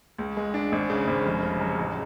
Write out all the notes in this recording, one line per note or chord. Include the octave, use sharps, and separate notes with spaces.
C#2
G#3
D4
G#1
C#3
G#1
F1
C#3
F#3
A1